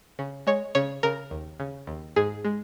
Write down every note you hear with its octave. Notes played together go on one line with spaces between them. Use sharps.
C#3
G#3 C#5
C#3 C#5
C#3 A#4
D#2
C#3
D#2
G#2 G#4
G#3